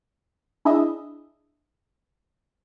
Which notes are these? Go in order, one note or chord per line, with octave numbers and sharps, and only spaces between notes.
D4 E4 G#4 D#5 E5